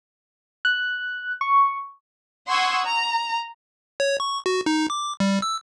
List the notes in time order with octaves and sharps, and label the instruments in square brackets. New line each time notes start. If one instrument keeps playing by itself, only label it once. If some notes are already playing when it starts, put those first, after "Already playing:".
[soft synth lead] F#6
C#6
[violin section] F#5 C6 C#6 D#6 E6 G#6
A#5
[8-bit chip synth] C#5
C#6
F#4
D#4
D6
G3
E6